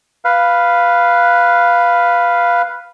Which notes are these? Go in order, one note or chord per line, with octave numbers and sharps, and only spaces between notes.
B4 F5